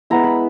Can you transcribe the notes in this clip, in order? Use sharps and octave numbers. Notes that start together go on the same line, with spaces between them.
G#3 B3 E4 A#5
B5